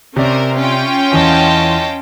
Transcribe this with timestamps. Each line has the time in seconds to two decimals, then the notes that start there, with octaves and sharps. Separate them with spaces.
0.16 C3 C#4 A#4 C5 D5
0.57 C#4 F4 G5
1.12 E2 E3 D#5 G#5 A5